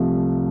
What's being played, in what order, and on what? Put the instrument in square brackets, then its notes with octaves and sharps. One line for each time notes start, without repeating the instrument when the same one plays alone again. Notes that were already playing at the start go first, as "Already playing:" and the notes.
Already playing: [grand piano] C2 C3 F3 A3